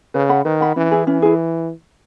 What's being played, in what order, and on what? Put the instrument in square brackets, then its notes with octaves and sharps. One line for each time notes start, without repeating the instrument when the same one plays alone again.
[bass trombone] C#3 [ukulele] B4
[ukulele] F#5 B5
[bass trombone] D#3 [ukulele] B4
[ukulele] F#5 B5
[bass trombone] E3 [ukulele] C#4
[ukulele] E4 G#4
[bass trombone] E3 [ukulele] C#4
[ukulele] E4 G#4